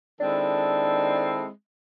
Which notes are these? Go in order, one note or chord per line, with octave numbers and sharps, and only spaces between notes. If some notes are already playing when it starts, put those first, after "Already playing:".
D#3 G#3 C4 D4 E4 A4